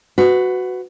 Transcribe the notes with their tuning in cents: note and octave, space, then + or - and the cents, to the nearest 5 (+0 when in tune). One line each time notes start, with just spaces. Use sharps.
F#4 +0 B4 +20